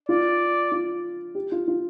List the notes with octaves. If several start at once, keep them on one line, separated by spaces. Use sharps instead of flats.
F4 D5
F4
G4
F4
F4